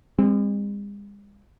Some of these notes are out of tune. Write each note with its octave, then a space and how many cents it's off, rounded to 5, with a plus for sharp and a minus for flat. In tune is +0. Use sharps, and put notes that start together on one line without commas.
G#3 -45 C4 +0